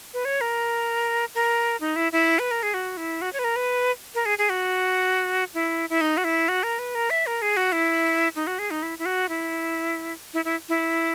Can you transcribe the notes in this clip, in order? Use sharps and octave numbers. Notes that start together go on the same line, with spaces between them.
B4
C#5
A#4
A#4
D#4
E4
E4
B4
A#4
G#4
F#4
E4
F#4
C#5
B4
A#4
B4
A#4
G#4
G#4
F#4
E4
E4
D#4
F#4
E4
F#4
A#4
B4
A#4
E5
A#4
G#4
F#4
E4
D#4
F#4
G#4
D#4
E4
E4
F#4
E4
E4
E4
E4